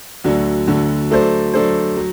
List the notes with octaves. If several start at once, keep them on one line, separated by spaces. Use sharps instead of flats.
D2 D3 F#3
D2 D3 F#3
F#3 A3 D4 A4 C5
F#3 A3 D4 A4 C5
F#3